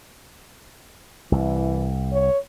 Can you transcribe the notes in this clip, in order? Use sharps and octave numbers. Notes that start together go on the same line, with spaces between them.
C2 E3
C#5